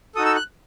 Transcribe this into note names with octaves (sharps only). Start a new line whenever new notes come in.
D#4 F#4 A4 D#6
E6
F#6